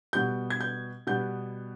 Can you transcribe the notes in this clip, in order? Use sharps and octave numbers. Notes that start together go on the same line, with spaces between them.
B2 G3 B3 G6
G#6
G6
B2 G3 B3 G6